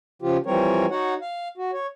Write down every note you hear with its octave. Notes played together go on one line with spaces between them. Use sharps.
C#3 F3 F4 G4
E3 F3 G3 C4 A#4 C#5
D#4 F#4 C#5 F#5
F5
F#4
C#5